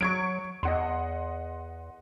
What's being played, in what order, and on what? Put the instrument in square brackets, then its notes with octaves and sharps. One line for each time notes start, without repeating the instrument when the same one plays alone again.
[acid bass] F#3 [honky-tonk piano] C#6 G#6 D7
[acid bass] E2 [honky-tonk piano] D#5 F#5 C6